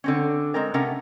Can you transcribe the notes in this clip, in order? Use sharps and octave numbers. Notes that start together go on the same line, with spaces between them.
D3 C4 C#4
G#3 C4 A#4
C3 A3 C#4 A#4 F#5